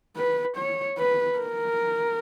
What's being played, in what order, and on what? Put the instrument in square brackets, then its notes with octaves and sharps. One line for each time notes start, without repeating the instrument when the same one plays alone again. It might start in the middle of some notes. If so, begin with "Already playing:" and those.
[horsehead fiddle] B4
C#5
B4
A#4